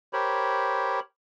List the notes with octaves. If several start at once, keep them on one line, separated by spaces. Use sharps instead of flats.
G4 A#4 C5 C#5 B5